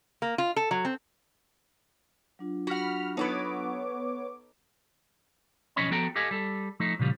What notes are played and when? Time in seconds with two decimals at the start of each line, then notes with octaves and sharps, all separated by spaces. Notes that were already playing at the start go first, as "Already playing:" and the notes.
0.22 A#3
0.38 F4
0.56 A4
0.71 F#3
0.85 C4
2.39 F#3 D4 F4
2.67 F#4 F#5 B5 F6
3.17 B3 D#4 A4 B4 C#5 D6
5.76 B1 F3 C#4 C#5 D#5 B5
5.90 F3 B3 F#4 A4 G5 A#5
6.16 G4 A4 D#5 F5 G#5
6.31 G3 A4
6.80 F3 A3 D#4
6.99 A#2 C#3 F3 G3